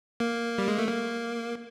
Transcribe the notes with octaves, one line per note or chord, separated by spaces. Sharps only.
A#3
G3
G#3
A3
A#3